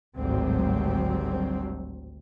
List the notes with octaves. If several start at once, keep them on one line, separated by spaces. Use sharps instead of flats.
G#1 D2 A2 F#3 G3 C4